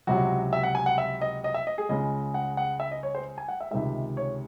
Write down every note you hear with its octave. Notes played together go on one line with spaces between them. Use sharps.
C#2 C3 F#3 F#4
E5
F#5
G#5
F#5
E5
D#5
D#5
E5
D#5
G#4
C#2 C#3 G#3 D#5
F#5
F#5
E5
D#5
C#5
C5
G#5
F#5
E5
C#2 C3 D#3 G#3 E5
C#5